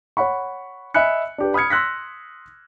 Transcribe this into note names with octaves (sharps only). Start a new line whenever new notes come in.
C#5 F#5 B5 C#6
D#5 E5 G#5 B5 F#6 C#7
D4 G4 B4
B5 D#6 F6 G#6 C#7
C6 E6 F#6 A#6 B6